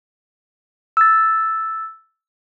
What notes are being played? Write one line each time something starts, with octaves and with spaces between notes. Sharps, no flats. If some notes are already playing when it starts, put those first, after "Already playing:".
E6 A6